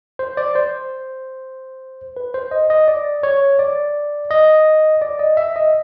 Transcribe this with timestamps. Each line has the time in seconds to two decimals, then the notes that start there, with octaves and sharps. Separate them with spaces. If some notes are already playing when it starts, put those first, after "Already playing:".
0.19 C5
0.37 D5
0.55 C5
2.17 B4
2.34 C5
2.51 D#5
2.70 D#5
2.88 D5
3.23 C#5
3.59 D5
4.31 D#5
5.02 D5
5.19 D#5
5.37 E5
5.56 D#5